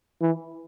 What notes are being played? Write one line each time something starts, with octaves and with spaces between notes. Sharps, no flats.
E3